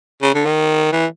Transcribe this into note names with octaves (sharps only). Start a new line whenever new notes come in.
C#3
D3
D#3
E3